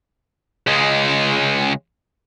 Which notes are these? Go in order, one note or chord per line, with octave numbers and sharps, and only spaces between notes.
C#2 G#3